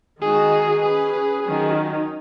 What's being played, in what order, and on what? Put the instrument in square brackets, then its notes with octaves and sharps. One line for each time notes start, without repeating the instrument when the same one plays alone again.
[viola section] D#3 G#3 D#4 F#4 [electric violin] G#4
[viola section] C#4 B4 [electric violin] G#4
[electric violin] G#4
[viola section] D#3 F#3 C#4 [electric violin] G#4
[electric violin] D#4